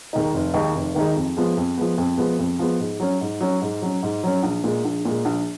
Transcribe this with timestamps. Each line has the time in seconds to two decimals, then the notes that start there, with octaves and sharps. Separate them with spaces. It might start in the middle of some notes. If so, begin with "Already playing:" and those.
0.13 D#2 D#3 G#3 D#4
0.34 F1
0.54 D#2 D#3 G#3 D#4
0.75 F1
0.95 D#2 D#3 G#3 D#4
1.16 F2
1.37 F3 G#3 B3
1.57 F2
1.77 F3 G#3 B3
1.98 F2
2.17 F3 G#3 B3
2.39 F2
2.59 F3 G#3 B3
2.79 G#2
3.00 F#3 C#4
3.21 G#2
3.41 F#3 C#4
3.62 G#2
3.82 F#3 C#4
4.03 G#2
4.23 F#3 C#4
4.43 A#1
4.64 A#2 G#3
4.85 A#1
5.05 A#2 G#3
5.25 A#1